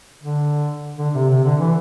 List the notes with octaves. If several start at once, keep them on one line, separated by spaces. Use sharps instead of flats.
D3
D3
C3
C3
D3
E3